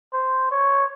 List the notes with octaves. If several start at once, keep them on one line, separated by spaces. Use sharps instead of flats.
C5
C#5